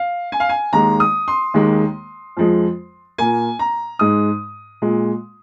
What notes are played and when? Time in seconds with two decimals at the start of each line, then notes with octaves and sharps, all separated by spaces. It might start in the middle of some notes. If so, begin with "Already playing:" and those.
Already playing: F5
0.32 G#5
0.40 F5
0.49 G#5
0.73 D#2 D#3 G#3 A#5
1.00 D#6
1.28 C6
1.54 D#2 D#3 G#3
2.37 F2 F3 G#3
3.18 A#2 A#3 G#5
3.59 A#5
3.99 G#2 G#3 D#6
4.82 A#2 G#3